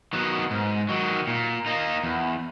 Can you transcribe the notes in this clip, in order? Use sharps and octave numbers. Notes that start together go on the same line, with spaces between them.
D#3 F#3 B3
G#2
D#3 F#3
A#2
A#3 D#4
E2